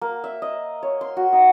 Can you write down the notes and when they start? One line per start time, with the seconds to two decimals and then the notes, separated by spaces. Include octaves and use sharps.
0.02 A#3
0.24 E5
0.42 D#5
0.83 C#5
1.01 C6
1.17 F#4
1.33 D#4